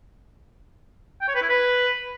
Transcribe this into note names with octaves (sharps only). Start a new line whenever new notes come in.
G5
C#5
B4
E4
B4